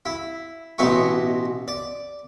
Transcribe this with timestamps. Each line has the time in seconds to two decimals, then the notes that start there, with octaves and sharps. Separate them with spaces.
0.06 E4
0.78 A1 B2 D#4 E4 C#6
1.68 D5